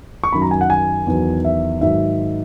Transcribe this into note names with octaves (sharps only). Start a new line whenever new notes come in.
C#6
F#2 D#3 F#3 B5
A#5
G#5
F#5
G#5
E2 D#3 F#3
E5
G#2 D#3 F#3 E5